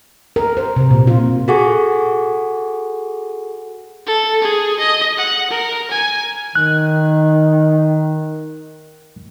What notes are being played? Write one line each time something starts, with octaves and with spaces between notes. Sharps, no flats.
A#4
C5
C3
A#2
F4
F#4 G#4 A4 F#5 G#5 C#6
A4
G#4
D#5
F#5
A#4
G#5
D#3 F#6